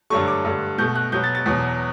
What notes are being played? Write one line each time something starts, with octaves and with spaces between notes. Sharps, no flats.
G2 D3 F#3 A3 C#6
D6
G2 D3 A3
B2 A3 G6
F#6
B2 F#3 B3 G6
A6
A6
E2 B2 F#3